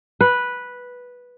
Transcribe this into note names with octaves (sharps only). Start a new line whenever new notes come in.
B4